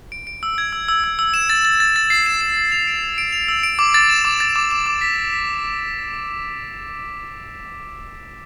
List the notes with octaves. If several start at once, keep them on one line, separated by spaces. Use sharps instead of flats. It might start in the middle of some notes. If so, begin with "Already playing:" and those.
D7
D7
E6
G#6
E6
E6
E6
E6
E7
A6
A6
A6
A6
C7
E7
E7
E6
F7
D7
F7
D7
F7
E6
D7
D6
A6
E7
D6
A6
D6
D6
D6
B6
B6
B6